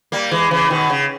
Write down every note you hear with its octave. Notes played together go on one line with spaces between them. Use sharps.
G3 A#3
E3 G#3
C#3 E3
B2 D#3
C#3